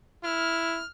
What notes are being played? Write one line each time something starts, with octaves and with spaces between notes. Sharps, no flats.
E4 F6